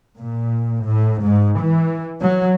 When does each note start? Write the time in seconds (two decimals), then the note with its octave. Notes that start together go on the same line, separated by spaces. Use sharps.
0.19 A#2
0.84 A2
1.23 G#2
1.60 E3
2.20 F#3